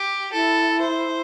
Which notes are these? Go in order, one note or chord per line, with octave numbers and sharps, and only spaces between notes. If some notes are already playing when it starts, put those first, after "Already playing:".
Already playing: G4
E4 A4
C5